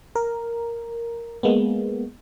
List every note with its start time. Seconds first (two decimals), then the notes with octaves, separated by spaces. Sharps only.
0.15 A#4
1.43 G#3 A#3 B3